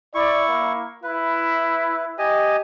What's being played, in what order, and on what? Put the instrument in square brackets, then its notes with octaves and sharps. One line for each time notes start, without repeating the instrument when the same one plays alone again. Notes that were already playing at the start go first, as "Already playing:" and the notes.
[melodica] E4 C#6 [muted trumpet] D5
[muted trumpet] A#3
[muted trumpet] E4 [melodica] B4
[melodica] G4 D#5 G#5